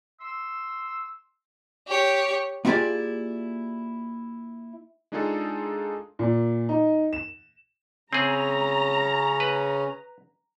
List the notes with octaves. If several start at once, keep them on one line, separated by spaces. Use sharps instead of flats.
C6 E6
G4 C#5
A#3 E4 F4 G4 G#4 D5
G#3 D4 D#4 F4 G#4 A4
A#2
D#4
E7
C#3 C4 C#4 G#4 A#5
B4